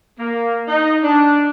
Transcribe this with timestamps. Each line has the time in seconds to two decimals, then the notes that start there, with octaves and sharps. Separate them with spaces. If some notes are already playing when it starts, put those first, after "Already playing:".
0.19 A#3
0.68 D#4
1.04 D4